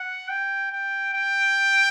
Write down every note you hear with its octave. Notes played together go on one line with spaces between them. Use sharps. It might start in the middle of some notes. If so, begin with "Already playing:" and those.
Already playing: F#5
G5
G5
G5